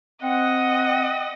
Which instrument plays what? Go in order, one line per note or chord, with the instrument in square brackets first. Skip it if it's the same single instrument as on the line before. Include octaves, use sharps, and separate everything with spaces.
[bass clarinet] C4 [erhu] D#5 [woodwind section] F#5